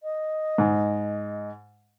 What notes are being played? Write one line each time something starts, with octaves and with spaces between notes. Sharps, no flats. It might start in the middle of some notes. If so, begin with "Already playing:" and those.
D#5
G#2